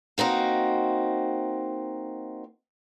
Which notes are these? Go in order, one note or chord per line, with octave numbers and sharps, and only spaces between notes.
A#3 C4 D#4 F#4